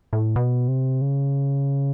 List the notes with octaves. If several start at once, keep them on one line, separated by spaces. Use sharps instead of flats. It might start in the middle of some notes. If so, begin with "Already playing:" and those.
A2
B2
C3
C#3